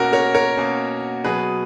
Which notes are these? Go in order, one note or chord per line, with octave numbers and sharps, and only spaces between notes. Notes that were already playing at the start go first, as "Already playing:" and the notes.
Already playing: B2 A#3 C#4 F#4 A#4
A#4 C#5
A#4 C#5
B2 A#3 C#4
B2 F#3 B3 G#4 B4